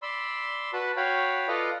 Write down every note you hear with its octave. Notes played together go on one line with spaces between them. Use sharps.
D5 B5 C6 E6
F#4 B4 A5 B5
F#4 C#5 F5 G5 B5
F4 A4 B4 D5 D#5 F5